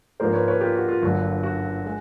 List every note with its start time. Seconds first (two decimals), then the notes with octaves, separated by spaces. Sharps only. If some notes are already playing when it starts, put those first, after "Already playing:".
0.20 G#2 F3 A#3 D4 A#4 C5
0.33 B4 C#5
0.48 B4 C#5
0.61 F4 G4
0.75 F#4
0.88 F4
1.02 G1 G2 D3 F#3 A#3 F#4
1.43 F#4
1.85 G#3